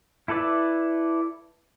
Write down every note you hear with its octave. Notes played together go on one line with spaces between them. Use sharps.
E4 A4 B4 D5 E5